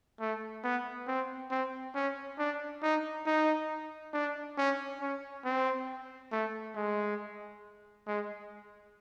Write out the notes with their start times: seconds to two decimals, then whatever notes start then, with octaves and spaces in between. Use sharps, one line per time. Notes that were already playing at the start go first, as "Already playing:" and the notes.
0.20 A3
0.64 B3
1.07 C4
1.51 C4
1.95 C#4
2.39 D4
2.82 D#4
3.26 D#4
4.13 D4
4.57 C#4
5.01 C#4
5.44 C4
6.32 A3
6.76 G#3
8.07 G#3